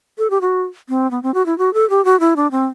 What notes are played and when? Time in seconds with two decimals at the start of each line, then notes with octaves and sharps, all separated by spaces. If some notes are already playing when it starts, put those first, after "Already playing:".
0.18 A4
0.30 G4
0.41 F#4
0.89 C4
1.11 B3
1.23 C4
1.34 F#4
1.46 E4
1.58 F#4
1.74 A4
1.90 G4
2.05 F#4
2.20 E4
2.36 D4
2.51 C4